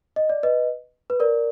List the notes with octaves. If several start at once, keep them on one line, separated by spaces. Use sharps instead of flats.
D#5
D5
B4 D#5
B4
A#4 D5